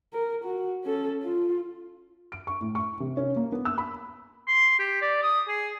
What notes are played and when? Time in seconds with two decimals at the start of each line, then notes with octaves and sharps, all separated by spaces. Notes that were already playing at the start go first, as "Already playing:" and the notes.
0.13 A#4
0.44 F#4
0.84 C#4 A4
1.23 F4
2.32 D7
2.47 C#6
2.61 A2
2.75 C#6
3.00 C3
3.17 C#4
3.36 A#3
3.52 B3
3.65 E6
3.78 B5
4.47 C6
4.79 G4
5.01 D5
5.22 D#6
5.48 G#4